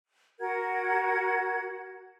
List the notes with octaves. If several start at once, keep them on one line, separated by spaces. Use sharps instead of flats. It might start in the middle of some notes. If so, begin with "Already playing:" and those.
F#4 A#4 F#5 G#6